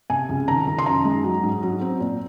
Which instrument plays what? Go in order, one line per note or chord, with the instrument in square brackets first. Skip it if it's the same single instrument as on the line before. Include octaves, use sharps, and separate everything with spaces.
[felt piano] C3 G#5
C#2
D#3 A#5
D#3
C6
F#2 A#5
G#3
F#3
G#2
F#3
C4
A#2